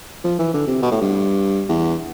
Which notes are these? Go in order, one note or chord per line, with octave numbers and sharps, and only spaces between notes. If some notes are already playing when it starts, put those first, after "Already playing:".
F3
E3
D3
C3
B2
A2
G2
E2